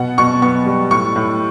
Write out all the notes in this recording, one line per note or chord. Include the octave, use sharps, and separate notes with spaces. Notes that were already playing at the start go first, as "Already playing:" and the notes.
Already playing: B2 B3 F#5
B2 C#6
B3 C#6
G3
A2 C#6
A2